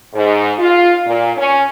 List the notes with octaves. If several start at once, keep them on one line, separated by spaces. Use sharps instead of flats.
G#2
F4
A#2
C#4